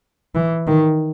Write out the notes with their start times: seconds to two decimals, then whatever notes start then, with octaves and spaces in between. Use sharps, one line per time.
0.35 E3
0.67 D#3